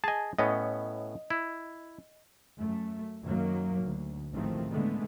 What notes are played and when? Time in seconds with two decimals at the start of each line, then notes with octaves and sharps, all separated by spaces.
0.04 G#4 D#5 G#5 A5
0.39 A2 B3 C#4 D#5
1.30 E4
2.58 F#2 A3
3.23 F#2 D#3 F#3 A#3
3.83 D2
4.33 A1 D#3 F3 G#3 A3 C4
4.71 D3 G#3 A3 B3